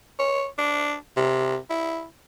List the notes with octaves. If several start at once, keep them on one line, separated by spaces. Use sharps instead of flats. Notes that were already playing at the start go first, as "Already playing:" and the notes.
C#5
D4
C3
E4